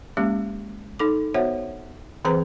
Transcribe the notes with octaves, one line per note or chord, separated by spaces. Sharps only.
G#3 A#3 C#4 G4
D#4 A4 D6
B3 F#4 C5 C#5 E5 F#5
E3 C4 G#4 B4 C5 A#5